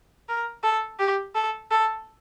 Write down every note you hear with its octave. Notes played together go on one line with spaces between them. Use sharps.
A#4
A4
G4
A4
A4